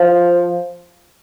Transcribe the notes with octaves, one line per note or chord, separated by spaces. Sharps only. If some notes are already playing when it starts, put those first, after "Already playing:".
Already playing: F3